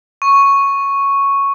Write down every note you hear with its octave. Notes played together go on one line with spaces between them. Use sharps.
C#6